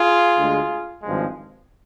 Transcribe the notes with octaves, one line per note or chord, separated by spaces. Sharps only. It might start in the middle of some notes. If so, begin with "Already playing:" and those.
Already playing: F4 G#4
D2 D3 G#3
G#1 G2 F3 G#3